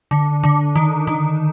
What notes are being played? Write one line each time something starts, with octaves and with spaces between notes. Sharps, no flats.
D3
D3
D#3
D#3